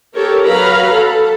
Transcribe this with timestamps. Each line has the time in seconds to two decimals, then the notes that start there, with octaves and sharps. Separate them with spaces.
0.15 G4 A4 A#4 C#5
0.45 F#3 B4 F5 A#5 B5
0.93 A4